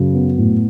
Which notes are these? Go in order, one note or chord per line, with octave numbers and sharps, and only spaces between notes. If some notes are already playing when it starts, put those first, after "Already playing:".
Already playing: F#2 C#3
B3
A2